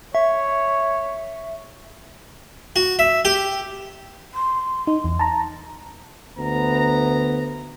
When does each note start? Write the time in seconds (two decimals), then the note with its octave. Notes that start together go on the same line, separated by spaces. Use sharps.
0.15 C#5 E5
2.76 F#4
2.99 E5
3.25 G4
4.34 C6
4.87 D#4
5.04 E2
5.19 A5 A#5
6.37 D2 B3 A#5